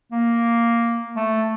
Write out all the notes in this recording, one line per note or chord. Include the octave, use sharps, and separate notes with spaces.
A#3
A3